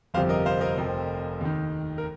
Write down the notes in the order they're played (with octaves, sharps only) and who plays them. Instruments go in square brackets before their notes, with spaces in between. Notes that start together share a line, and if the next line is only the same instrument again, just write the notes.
[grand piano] G1 F2 C3 F3 C5 F5
A#4 D#5
C5 F5
A#4 D#5
F1 F2 F3
D#2 D#3
A#4